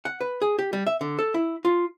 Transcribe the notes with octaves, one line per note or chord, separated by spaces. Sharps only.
F#5
B4
G#4
G4
G3
E5
D3
A4
E4
F4